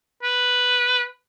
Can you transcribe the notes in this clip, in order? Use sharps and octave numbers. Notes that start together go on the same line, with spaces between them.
B4